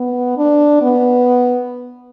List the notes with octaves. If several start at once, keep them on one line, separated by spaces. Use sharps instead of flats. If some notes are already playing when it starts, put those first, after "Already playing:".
Already playing: B3
D4
B3